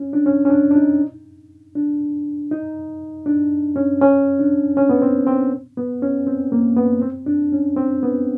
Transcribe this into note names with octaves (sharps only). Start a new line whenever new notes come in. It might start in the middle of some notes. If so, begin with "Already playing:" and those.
Already playing: C#4
D4
C#4
C#4
D4
D4
D#4
D4
D#4
D4
C#4
C#4
D4
C#4
B3
C4
C4
B3
C#4
C4
A#3
B3
C4
D4
C#4
C4
B3